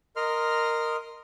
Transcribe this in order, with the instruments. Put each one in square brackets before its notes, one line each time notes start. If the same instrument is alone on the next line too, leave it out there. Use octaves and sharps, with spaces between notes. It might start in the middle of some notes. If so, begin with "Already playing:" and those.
[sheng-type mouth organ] A#4 D#5 C6 F6